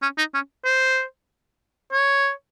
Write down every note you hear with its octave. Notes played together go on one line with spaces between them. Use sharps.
C#4
D#4
C#4
C5
C#5